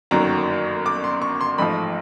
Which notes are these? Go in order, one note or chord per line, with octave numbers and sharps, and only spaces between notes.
G1 F#2 D#3 F#3 A#3 A#5
D6
C6
C#6
C6
A1 G#2 F3 A3 B5